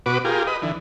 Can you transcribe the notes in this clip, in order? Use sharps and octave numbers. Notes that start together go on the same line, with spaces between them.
B2 F#4 B4 D6
F4 G4 G#4 A#4
B4 D#5
D3 E3